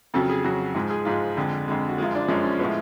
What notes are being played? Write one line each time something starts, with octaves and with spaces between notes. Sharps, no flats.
F2 C#3 F#3 A4
G#4
F2 C#3 F#3 F#4
G#2 F3 G#3
G#4
G#2 F3 G#3 F4
F2 D3 G#3
F2 D3 G#3
F#4
F#2 F3 G#3 F4
D4
F#2 F3 G#3 C#4
C#4
A2 F3 G#3 B3